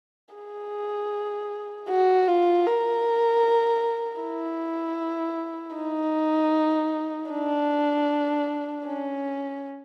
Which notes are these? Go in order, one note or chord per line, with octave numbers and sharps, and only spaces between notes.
G#4
F#4
F4
A#4
E4
D#4
D4
C#4